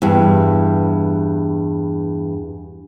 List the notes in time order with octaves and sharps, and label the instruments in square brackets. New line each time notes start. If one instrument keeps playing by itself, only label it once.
[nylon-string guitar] E2 G2